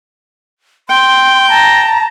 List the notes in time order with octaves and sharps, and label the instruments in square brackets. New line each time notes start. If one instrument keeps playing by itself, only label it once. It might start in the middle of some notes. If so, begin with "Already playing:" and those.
[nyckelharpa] G5 [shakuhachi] C6
[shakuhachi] A5 [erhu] A#5